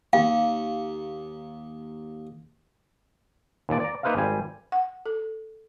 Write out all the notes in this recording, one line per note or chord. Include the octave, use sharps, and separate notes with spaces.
D#2 F5
D#2 A#2 D5
D5 A#5
A#3 D#4 B4 C5 E5 F5
G#1 G3 C5 G#5
F#5
A4